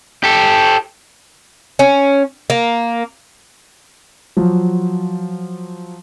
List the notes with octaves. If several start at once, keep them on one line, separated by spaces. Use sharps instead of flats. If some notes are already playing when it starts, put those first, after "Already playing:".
G4 A4
C#4
A#3
F3 F#3